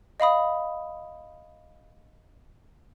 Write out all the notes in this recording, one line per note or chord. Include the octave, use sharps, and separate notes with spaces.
D#5 F5 B5 D#6